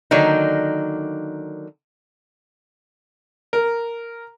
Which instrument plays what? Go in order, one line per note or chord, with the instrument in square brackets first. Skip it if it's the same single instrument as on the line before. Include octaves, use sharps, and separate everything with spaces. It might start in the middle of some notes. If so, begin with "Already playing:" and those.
[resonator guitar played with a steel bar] D3 D#3 F#3 A#3 D4 D#4
[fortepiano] A#4